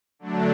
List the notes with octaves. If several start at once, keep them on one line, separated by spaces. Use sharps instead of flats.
D3 F#3 A3 D4